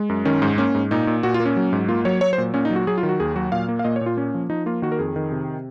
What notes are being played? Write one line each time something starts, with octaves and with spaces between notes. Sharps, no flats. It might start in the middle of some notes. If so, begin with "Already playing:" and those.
Already playing: G#3
F#2
D#3 C#4
G#2
A#3 C#4
G#2
A#2 D#4
A#2
A#2 F#4
F4
A#3
C#4
F#3
G#2
A#3 F4
F#3 C#5
F#3 C#5
C5
A#2
A#2 C#4
D#4
F#3
F#4
F#3 G#4
F4
D#3
F#4
D#2 G#4
F#3 F#4
A#2 F5
A#3
F5
A#2 D#5
C#5
A#2
F4
A#3 C#4
F3
F3 D#4
A#3 F4
D#3 F#4
A#4
F2 G#4
D#3
C3